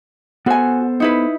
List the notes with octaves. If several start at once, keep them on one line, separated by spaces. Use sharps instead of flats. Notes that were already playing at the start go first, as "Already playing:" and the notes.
B3 F#4 A4 C5 G#5
D#4 E4 B4